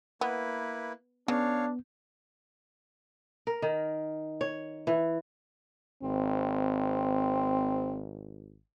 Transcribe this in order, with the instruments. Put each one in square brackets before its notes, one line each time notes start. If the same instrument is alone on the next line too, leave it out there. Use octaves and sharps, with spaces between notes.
[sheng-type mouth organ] A#3 E4 B4 [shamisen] B3
[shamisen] C#3 [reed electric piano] B3 [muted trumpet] D4 [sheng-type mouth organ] C#5 F5
[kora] A#4
D#3
C#5
E3
[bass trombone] G#1 [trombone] C4